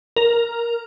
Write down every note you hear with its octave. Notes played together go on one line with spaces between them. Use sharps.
A#4